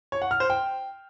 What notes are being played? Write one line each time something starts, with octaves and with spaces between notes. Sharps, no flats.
C#5
F#5
F6
C5
G5